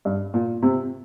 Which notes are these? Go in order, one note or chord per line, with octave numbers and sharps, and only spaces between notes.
G2
A#2
C3